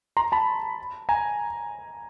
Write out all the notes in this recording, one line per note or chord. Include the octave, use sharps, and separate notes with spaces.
A#5 C6
A5 B5
G#5 A#5